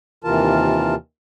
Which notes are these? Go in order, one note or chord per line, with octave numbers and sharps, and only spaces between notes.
D#2 C3 E3 F4 A#4 A5